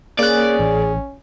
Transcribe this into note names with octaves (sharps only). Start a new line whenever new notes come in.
A#3 C#4 G#4 D5 F#6
A1